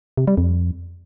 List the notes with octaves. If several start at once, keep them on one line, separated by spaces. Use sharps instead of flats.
C3
G3
F2